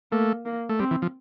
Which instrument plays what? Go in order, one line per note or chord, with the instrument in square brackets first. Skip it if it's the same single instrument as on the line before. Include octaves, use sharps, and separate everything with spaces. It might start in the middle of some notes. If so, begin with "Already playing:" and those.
[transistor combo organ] A3 [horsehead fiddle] A#3
[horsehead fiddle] A#3
[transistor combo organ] A3
[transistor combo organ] G3 [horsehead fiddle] C4
[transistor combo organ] E3
F3